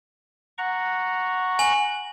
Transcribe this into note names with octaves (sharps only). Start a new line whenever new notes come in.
F#5 A#5 C#6
G#5 F#7